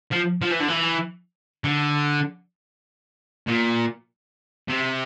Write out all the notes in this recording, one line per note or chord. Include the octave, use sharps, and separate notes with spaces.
F3
F3
E3
D3
E3
D3
A#2
C3